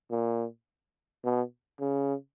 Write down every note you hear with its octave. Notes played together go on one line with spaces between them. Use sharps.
A#2
B2
C#3